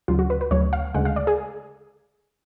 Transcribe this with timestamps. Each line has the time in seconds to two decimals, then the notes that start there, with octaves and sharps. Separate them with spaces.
0.08 D2 C#3 F#3 F4
0.19 F#4
0.30 B4
0.41 B4
0.51 D2 C#3 F#3 C#5
0.73 F5
0.94 D2 C#3 G#3 F#5
1.05 F5
1.16 D5
1.27 G#4